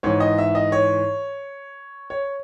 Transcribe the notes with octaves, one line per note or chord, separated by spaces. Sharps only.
G#2 E3 C#5
D#5
E5
D#5
C#5
C#5